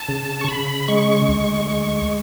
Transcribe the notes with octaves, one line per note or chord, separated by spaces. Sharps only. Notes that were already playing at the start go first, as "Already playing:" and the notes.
Already playing: A5
C#3
C#6
C#3 B5
G#3 C#6
D2
G#3